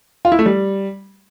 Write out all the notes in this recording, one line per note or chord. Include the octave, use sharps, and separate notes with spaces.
F4
E4
A3
G3